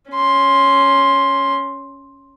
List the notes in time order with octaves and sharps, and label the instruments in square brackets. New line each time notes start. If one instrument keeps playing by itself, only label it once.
[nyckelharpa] C#4 C6